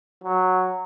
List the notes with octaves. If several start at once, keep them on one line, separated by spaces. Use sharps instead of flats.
F#3